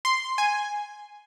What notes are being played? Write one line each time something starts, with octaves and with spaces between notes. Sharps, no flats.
C6
G#5